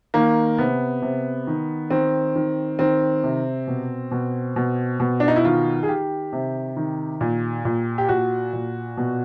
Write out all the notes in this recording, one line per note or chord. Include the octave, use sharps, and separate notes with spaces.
D#3 A#3
C3 B3
C3
D#3
D#3 C4
D#3
D#3 C4
C3
B2
B2
B2
B2
D4
D#4
E4
D#3 F4
G#4
D#3 G4
C3
D#3
A#2
A#2
G4
A#2 F#4
A#2
B2